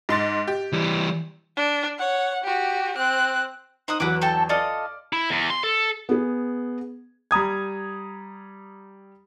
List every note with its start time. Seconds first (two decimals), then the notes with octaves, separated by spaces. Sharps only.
0.09 G#2 C6 A6
0.48 G4
0.73 E3 G3
1.57 D4
1.98 C#5 F#5
2.44 F#4 G4
2.97 C4 F#6
3.88 D#4 C5 F#5 D#6
4.00 E2 E3 F#3 B4 F#5 D6
4.22 A4 G5 A5
4.49 F4 A4 D5 D#5 D6 F6
5.13 E4
5.30 E2
5.50 C6
5.63 A4
6.09 B3 G#4
7.31 G3 A#5 D#6 G#6